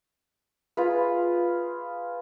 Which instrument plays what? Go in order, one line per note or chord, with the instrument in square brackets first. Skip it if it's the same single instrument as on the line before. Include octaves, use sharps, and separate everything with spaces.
[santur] F4 G#4 B4